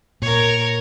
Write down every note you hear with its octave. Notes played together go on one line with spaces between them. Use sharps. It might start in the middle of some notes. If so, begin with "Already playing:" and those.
A#2 A#4 C#5